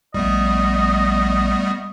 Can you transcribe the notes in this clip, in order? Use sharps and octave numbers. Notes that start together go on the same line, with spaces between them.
A#1 G3 A3 B3 D#5